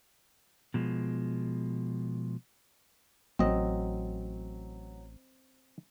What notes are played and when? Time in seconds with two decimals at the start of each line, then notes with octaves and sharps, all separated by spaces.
0.74 B2 F3 G#3
3.39 A1 F#3 C4 D#5